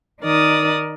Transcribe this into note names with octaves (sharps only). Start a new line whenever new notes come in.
D#3 D#4 A#4 D5 D#6